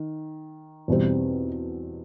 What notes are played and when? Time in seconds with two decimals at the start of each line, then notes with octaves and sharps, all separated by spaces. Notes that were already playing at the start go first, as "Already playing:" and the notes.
Already playing: D#3
0.88 E2 B2 G3 C4